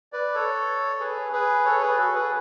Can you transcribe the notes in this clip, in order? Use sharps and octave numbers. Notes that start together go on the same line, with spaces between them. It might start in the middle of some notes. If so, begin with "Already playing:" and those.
B4 D5
A4 C#5
G#4 B4
G#4 B4
A4 C#5
G#4 B4
F#4 A4
G#4 B4